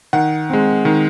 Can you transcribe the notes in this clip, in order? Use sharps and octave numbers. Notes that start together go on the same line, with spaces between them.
D#3 F#5
G#3 C4
D#3